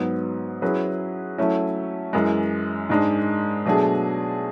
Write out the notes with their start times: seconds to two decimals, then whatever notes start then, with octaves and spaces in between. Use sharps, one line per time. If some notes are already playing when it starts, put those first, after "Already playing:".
Already playing: G#2 F#3 B3
0.62 F#3 C#4 E4 G#4 B4
1.38 F#3 A3 C#4 E4
2.13 F#2 E3 G#3
2.90 G#2 G#3 D4
3.65 B2 F#3 A3 D4 G#4